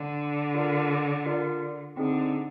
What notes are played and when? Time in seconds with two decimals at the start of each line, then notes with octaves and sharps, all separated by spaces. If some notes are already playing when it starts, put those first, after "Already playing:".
Already playing: D3
0.55 F4 A#4 D5
1.26 F4 A#4 D5
1.97 D3 C4 D#4 G#4